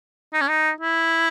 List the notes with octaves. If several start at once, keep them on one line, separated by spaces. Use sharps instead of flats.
D#4
C#4
D#4
E4